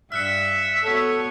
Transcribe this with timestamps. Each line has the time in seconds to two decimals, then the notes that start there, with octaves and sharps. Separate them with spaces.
0.12 G2 E5 F6 F#6 C#7
0.83 B3 F#4 A4 C#5